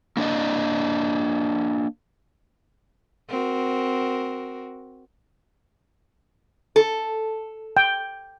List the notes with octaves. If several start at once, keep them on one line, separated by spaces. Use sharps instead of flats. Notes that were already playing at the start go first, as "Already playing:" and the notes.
A#3 D4 D5 D#5
C4 F#4 A#4
A4
G5